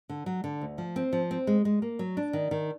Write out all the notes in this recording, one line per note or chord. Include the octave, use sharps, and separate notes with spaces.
D3
F#3
D3
D2
F3
C4
F3
C4
G#3
G#3
A#3
F#3
D4
D#3
D#3